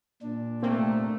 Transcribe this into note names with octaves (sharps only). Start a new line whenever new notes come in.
A#2 D4
C3 A3 A#3 C4